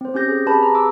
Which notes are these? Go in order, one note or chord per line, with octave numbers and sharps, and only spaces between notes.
C4 C5
C4 C#4 G4 G6 A#6
G#4
C4 G4 G#4 B4 A5 B5
A#5
D6 E6